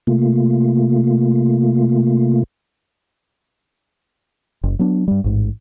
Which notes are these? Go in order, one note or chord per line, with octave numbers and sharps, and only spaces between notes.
C3 A3 A#3 F4
F#1
F#3 B3 D4
G2 G3
A1 G#2